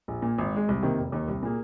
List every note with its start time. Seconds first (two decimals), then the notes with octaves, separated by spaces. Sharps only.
0.08 A#1
0.22 A#2 A#3
0.38 G#1
0.53 G#2 G#3
0.69 C2
0.83 C3 D#3 A#3
0.98 F1
1.12 D#2 D#3
1.28 C2
1.43 A#2 A#3 G#4